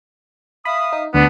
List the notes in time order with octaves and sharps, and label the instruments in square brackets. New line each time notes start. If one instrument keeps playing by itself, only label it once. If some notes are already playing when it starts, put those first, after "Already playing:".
[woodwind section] E5 F5 D#6 [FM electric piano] B5
[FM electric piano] D#4
[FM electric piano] D2 [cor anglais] B3 [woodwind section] D4